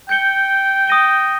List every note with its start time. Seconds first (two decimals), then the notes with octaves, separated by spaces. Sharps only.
0.09 G5 G6 C#7 G7
0.87 D#6 A#6 D#7 G7